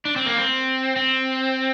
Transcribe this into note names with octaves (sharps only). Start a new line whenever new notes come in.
D4
C4
A#3
C4
C4